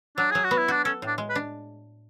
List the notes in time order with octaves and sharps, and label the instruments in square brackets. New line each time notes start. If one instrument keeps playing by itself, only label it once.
[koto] F#3 [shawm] D4
[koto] F#3 [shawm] G#4
[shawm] F#4
[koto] B3
[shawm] E4
[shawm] D4 [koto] F#4
[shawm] C#4 [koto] A4
[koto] A2 [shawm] D4
[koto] G#3
[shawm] B4
[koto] D4